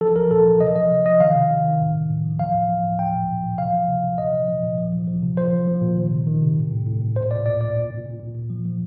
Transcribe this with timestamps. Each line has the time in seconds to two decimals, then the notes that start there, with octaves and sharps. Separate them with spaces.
0.01 F3 A4
0.16 F3 A#4
0.31 A#2 A4
0.46 F3
0.60 C3 D#5
0.75 F3 D#5
0.91 C3
1.05 F3 D#5
1.20 D#3 F5
1.35 C3
1.50 C3
1.65 D#3
1.80 A2
1.95 A2
2.10 A2
2.25 F3
2.39 F3 F5
2.54 A2
2.69 F3
2.84 A2
2.99 F3 G5
3.14 A#2
3.28 A#2
3.44 F3
3.58 C3 F5
3.73 F3
3.88 C3
4.03 C3
4.18 A#2 D#5
4.33 F3
4.48 F3
4.63 A#2
4.78 F3
4.93 F3
5.07 F3
5.22 C3
5.37 F3 C5
5.52 F3
5.67 F3
5.81 A#2
5.97 D#3
6.12 C3
6.27 D#3
6.42 C3
6.56 A2
6.71 A2
6.86 A2
7.02 A2
7.16 A#2 C5
7.31 A#2 D5
7.46 A#2 D5
7.60 A#2 D5
7.76 A#2
7.90 A#2
8.06 A#2
8.20 A#2
8.35 A#2
8.50 F3
8.65 F3